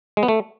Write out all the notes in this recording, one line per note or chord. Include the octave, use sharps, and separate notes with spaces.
G#3
B3
A3